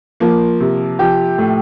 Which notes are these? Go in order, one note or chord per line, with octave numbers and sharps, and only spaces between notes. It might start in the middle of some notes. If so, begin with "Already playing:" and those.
F3 A#3
C3
F3 G4
A2